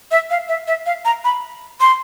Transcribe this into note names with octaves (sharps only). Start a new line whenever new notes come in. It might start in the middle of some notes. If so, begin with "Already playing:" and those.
E5
F5
E5
E5
F5
A#5
B5
C6